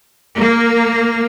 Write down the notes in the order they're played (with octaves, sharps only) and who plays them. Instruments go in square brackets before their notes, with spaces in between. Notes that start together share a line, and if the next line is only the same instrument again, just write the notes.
[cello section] A#3